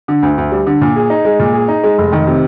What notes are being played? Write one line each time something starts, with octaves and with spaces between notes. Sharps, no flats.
D3
D2
D2
G3
D3
A#2
G#4
D#4
G#3
A#2
G#4
D#4
G#3
F1
D#3
C3